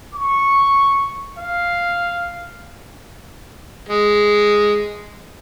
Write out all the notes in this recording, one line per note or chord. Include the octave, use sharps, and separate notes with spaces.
C#6
F5
G#3